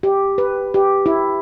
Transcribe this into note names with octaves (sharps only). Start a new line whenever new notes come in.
G4
B4
G4
E4